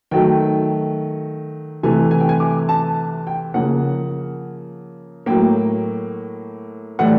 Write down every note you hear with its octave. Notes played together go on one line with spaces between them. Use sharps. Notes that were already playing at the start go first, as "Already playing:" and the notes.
D#3 F#3 A3 G5
C3 E3 A3 G#5
G#5
G5
G#5
D6
A5
G5
C#3 F3 A#3 F#5
A2 F#3 A#3 G5
A2 E3 G3 F#5